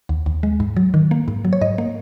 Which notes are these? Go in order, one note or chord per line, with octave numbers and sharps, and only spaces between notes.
D#2
D#2
G#3
G#2
F#3
D#3
A#3
G#2
F#3
C#5
G#2 D#5
A#3